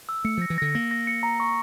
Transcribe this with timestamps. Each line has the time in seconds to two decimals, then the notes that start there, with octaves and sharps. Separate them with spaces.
0.09 E6
0.24 A3 C#7
0.37 F3 A#6
0.50 E3
0.58 D3 A#6
0.75 A#3 A#6
0.91 A#6
1.07 C#7
1.23 A#5
1.40 C#6